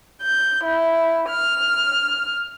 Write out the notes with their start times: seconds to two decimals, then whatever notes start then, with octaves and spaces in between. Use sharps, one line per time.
0.23 G6
0.65 E4
1.30 F6